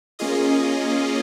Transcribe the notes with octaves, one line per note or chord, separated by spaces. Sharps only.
A#3 C#4 F4 G#4 D#5